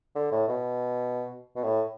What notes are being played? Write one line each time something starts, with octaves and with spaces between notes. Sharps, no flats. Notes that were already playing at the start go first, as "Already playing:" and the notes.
D3
A2
B2
B2
A2